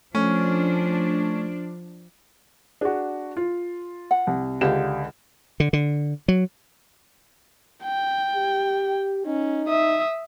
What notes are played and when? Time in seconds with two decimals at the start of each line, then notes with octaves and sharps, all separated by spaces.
0.15 F3 A3 C#4 D4
2.81 D4 F#4 G#4
3.37 F4
4.11 F#5
4.27 C2
4.61 C#2 D3 G4 F5 E7
5.60 D3
5.73 D3
6.28 F#3
7.84 G5
8.36 G4
9.26 C#4 D#4
9.68 E5 D#6